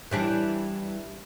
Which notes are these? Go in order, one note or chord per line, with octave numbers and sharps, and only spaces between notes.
E3 G3 D4